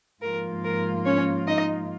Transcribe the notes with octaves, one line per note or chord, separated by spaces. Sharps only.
G#2 F3 A#3 F4 A#4
A#4
C#4 C#5
D#4 D#5